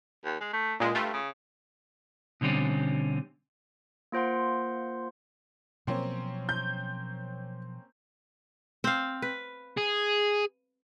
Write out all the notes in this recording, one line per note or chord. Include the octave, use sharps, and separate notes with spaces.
D#2
G#3
A3
C#2 A#2 G#3
G2 A3 F4
C#3
B2 D3 G3 C4 C#4
A#3 F4 C5 F#5 C6
B2 F3 F#3 A#3 C4 C#4
G6
C4 F5
B4
G#4